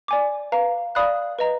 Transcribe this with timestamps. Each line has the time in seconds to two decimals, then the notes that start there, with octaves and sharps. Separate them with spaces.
0.08 D5 G#5 D6
0.52 B4 F5 A#5
0.95 D5 F5 B5 D#6 F#6
1.39 B4 D#5 A#5